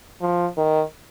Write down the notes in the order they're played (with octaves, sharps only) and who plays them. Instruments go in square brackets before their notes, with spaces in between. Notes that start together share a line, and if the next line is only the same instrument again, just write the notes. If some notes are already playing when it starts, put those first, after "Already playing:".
[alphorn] F3
D#3